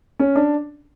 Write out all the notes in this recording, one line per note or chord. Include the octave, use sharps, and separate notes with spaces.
C#4
D4